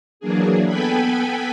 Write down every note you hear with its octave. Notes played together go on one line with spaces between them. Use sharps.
E3 F#3 A#3 D4 G#4
B3 A4 B4 G5 G#5 B5